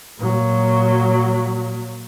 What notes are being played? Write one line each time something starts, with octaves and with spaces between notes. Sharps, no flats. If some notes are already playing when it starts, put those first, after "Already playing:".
A#2 F#3